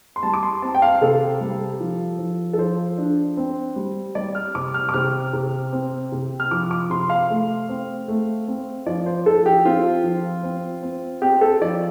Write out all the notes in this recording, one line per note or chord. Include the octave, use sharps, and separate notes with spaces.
C6
G3 A5
D6
C6
C4 A5
G5
F5
C3 A4
G3
F3
F3
A4
F3 C5
D4
C4
G3
G3 D5
F6
C3 D6
F6
D6
C3 F6
C3
C4
C3
F6
F3 D6
D6
C3 C6
F5
A3
C4
A3
C4
F3 D5
C5
F3 A4
G4
C4 F4
F3
C4
C4
C4 G4
A4
F3 D5